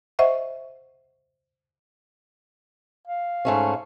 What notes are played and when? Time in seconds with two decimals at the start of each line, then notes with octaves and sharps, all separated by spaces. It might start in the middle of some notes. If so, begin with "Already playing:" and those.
0.19 C5 D#5 E5 F#5 C#6
3.07 F5
3.45 G#2 A3 C#4